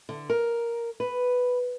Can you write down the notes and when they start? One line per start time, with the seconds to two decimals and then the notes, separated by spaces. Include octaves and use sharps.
0.09 D3
0.30 A#4
1.00 B4